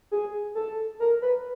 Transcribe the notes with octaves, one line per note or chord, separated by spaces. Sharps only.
G#4
A4
A#4
B4